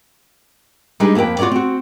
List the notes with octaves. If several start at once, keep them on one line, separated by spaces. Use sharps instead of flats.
G3 G#3 D4 D#4 G#4 B4
F2 A#3 G4 B4 G5
F4 F#4 A#4 C#5 D5
C4 F#4